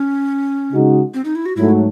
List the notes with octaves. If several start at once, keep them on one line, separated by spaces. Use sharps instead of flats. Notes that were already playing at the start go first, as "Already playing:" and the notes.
Already playing: C#4
C#3 G#3 D#4 F#4
C4
D#4
E4
F#4
G#2 F#3 A3 E4